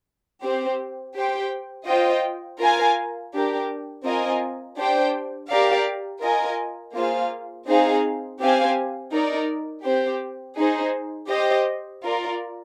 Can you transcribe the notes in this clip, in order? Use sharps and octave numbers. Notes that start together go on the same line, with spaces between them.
C4 G4 C5
G4 C5 G5
F4 C5 D#5 G5
F4 A#4 F5 G#5
D4 G4 A#4
C4 F4 A#4 D#5 G#5
D4 G4 C5 G5
G4 A#4 D5 F5
F4 A#4 D#5 G#5
A#3 F4 G#4 C5 F5
C4 D#4 G#4 C5 F5
C4 G4 C5 F5 G#5
D#4 A#4 D5
C4 G4 C5
D#4 G#4 C5
G4 C5 D#5
F4 A#4 D5